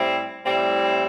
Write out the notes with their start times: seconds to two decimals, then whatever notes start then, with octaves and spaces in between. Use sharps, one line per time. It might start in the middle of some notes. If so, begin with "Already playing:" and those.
Already playing: A2 G3 C4 E4
0.44 A2 G3 C4 E4